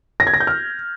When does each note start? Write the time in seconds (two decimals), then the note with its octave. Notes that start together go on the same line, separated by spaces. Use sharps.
0.20 A#6
0.27 G#6
0.34 A#6
0.40 G6
0.47 F6